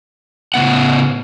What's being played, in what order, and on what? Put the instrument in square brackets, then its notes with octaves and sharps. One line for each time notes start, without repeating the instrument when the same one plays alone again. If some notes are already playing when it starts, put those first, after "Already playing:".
[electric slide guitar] A2 C#3 B3 F#5